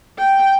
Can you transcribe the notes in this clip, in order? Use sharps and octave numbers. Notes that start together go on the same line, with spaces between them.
G5